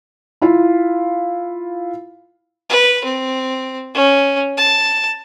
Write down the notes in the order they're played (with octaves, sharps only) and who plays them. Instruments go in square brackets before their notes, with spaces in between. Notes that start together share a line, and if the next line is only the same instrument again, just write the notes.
[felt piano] E4 F4 F5
[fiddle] B4
C4
C#4
A5